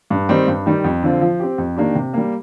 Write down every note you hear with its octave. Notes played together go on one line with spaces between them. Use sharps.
G2
D#3 G3 C4 D#4
G2
D#3 G3
F2
D3 F3 C4 F4
F3
C4 G4
F2
D#3 A#3 D4 G4
C3
G3 A#3